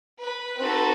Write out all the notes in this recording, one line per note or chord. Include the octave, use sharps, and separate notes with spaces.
B4
C4 D#4 F#4 A4